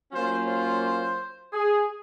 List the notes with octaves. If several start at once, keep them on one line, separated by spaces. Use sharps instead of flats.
F#3 A#3 C#4 F4 C5
C5
G#4